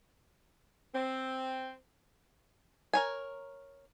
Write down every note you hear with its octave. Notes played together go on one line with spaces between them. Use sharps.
C4
A#4 C#5 G#5